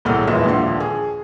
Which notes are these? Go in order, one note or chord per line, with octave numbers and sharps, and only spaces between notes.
E1 C2 A2 A4 F#5 F6
D#1 F2 A#2 E3 G#3 E5
D#1 A#1 D3 F3 F#5 C6
G#4